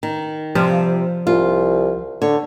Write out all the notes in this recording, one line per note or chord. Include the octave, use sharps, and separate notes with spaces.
D#3
C3 F3 G3
C2 F4
D3 C#5